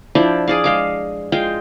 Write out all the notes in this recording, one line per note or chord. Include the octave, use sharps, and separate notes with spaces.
F3 D4 E4 D5
G#4 D5 F5
G#3 F5 D6
G#3 F4 G5